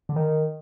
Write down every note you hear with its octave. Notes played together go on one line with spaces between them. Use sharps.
D3
D#3